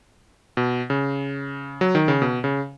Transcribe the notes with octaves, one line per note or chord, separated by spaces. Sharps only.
B2
C#3
F#3
D#3
C#3
B2
C#3